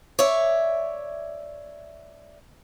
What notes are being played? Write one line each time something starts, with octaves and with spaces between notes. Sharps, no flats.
C#5 D5 E5